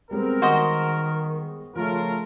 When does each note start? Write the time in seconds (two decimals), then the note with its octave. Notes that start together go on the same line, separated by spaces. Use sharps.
0.11 G3 G#3 B3 C4 A#4
0.42 D#3 F#4 C5 D#5
1.76 C#3 F3 A3 F4 A#4